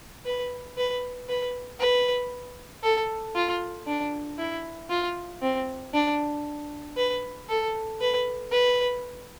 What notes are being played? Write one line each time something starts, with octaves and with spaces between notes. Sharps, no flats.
B4
B4
B4
B4
A4
F4
D4
E4
F4
C4
D4
B4
A4
B4
B4